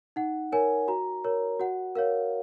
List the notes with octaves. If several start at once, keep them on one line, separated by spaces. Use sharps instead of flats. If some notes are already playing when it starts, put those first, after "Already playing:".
D#4 F#5
A#4 C#5 G#5
F#4 A#5
A#4 C#5
F#4 F#5
A#4 C#5 F5